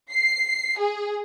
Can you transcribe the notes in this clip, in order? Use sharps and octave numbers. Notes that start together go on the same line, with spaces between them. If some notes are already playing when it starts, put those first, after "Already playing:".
C7
G#4